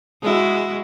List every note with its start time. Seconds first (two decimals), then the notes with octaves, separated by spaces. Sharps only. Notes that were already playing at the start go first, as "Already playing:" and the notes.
0.23 G#3 E4 F#4